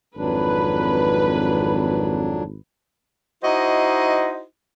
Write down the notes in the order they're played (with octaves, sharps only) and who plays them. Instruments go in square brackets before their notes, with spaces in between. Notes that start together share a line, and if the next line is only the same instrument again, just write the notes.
[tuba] G#1 [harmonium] F2 F#3 D4 [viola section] B4
[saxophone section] D#4 E4 F#4 C5 D#5